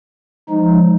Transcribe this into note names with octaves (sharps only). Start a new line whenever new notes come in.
F3 G#3 D#4